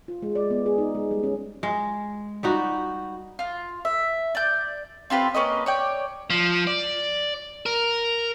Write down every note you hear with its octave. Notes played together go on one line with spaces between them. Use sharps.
F4
G#3
D5
B3
G#4
D#4
G#3
G3
C#4
G#3
G3 D#4 F#4
F4
E5
D5 G6
C4 F4 G4 B4
A#3 C#4 B4 D#5
C#5 D5 G5
F3
D5
A#4